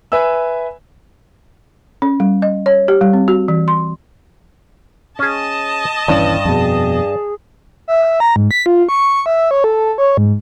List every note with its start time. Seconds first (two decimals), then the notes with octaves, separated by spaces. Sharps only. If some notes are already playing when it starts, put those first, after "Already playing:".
0.12 B4 E5 G#5 E6
2.02 C#4
2.20 G3
2.42 D#5
2.66 C#5
2.88 G4
3.01 G3
3.13 C4
3.28 F#4
3.48 E3
3.68 C6
5.19 C#4 G#4 D#5 A5
6.08 D#1 G2 E3 C#4
6.45 F2 B2 G#4
7.88 E5
8.02 E5
8.20 A#5
8.36 G#2
8.51 B6
8.66 F4
8.89 C#6
9.26 E5
9.51 C#5
9.64 A4
9.98 C#5
10.17 G#2